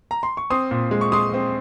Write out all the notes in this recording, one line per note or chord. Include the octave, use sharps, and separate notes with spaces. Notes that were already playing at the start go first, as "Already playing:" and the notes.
A#5
C6
C#6
C4 C6 D#6
A#2
G#3
C#6
G#3 C6 D#6
C4